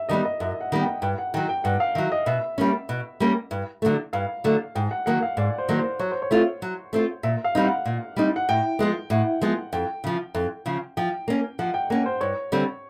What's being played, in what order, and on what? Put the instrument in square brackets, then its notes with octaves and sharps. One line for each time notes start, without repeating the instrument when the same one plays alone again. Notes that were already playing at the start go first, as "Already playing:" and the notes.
Already playing: [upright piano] E5
[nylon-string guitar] D#3 G3 B3 [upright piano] D#5
[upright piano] D#5
[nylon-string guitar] F#2 [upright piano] E5
[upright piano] F#5
[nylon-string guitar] D#3 G3 B3 [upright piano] F#5
[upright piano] G5
[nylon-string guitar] G2 [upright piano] G5
[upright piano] F#5
[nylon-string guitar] D#3 [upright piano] G5
[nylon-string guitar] F#3
[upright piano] G5
[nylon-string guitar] G2 [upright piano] F#5
[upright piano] F5
[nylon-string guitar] D#3 F#3 [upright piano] E5
[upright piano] D#5
[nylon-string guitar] B2 [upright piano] E5
[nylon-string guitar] G3 A#3 C#4
B2
G3 A#3 C#4
G2
D3 F#3 A3
[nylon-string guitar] G2 [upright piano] F5
[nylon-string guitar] D3 F#3 A3
[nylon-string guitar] G#2 [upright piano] G5
[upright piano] F#5
[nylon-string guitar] D#3 F#3 A#3 [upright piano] F#5
[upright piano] F5
[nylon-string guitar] G#2 [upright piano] D5
[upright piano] C5
[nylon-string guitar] D#3 F#3 A#3
[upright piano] C5
[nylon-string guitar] F#3 [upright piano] C#5
[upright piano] C5
C#5
[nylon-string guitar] A3 C4 F4
F#3
A3 C4 F4
[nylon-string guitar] A#2 [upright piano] E5
[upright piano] F5
[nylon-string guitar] G3 C4 D#4 [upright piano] F5
[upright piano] F#5
[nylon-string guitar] A#2
G3 C4 D#4
[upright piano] F#5
[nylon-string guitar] A2 [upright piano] G5
[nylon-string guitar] F3 G#3 B3
[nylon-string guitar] A2 [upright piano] F#5
[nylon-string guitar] F3 G#3 B3
[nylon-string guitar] F2 [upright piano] G5
[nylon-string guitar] C#3 F3
F2
C#3 F3
[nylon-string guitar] F3 [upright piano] G5
[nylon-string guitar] A#3 C#4
[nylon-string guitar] F3 [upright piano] F#5
[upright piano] G5
[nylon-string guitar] A#3 C#4 [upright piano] F#5
[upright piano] C5
[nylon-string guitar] G2 [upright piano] C#5
[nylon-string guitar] D3 G3 C4